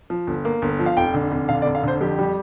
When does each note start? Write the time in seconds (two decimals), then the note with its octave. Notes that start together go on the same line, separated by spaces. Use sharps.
0.10 F3
0.27 G1
0.45 A#3
0.62 G1
0.79 F3
0.86 F5
0.97 F1 G5
1.14 D3
1.32 F1
1.49 D3 F5
1.62 D5
1.66 F1
1.75 F5
1.83 D3 C5
2.01 F2 G4
2.19 G3